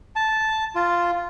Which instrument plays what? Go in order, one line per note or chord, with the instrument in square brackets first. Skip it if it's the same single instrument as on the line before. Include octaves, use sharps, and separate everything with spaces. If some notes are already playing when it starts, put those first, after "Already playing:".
[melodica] A5
F4